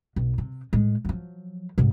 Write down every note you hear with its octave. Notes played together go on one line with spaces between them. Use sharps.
B1
C3
A2 G#3
F3 F#3
G#2 C3